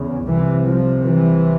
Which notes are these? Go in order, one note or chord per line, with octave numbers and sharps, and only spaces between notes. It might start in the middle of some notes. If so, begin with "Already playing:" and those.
Already playing: E2 C#3
C2 C3 E3
F3
E3